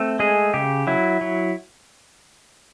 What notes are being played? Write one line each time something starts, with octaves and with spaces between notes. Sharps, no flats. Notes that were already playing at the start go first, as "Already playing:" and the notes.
Already playing: A3 C4
G#3 G#4
C#3 G4
F#3 E4
F#3